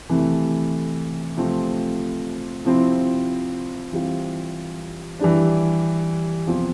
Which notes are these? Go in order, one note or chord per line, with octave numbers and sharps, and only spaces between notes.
C3 E3 A3
C3 F3 A3 C4
C3 F3 C4 E4
E3 G3 C4 F4
E3 G3 D4
E2 C3 F3 C4 F4